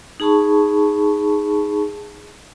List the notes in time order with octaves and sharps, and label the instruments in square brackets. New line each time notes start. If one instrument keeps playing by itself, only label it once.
[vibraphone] D#4 G#4 A5 B5 C#6